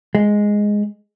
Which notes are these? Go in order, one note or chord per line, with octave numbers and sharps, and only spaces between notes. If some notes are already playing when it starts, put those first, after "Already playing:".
G#3